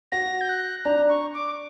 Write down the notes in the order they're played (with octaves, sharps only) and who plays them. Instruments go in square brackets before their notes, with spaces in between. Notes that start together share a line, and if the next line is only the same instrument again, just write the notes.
[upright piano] F#4 [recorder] A#6
[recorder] G6
F#6
[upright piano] D4 [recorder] A#5
[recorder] C#6
D6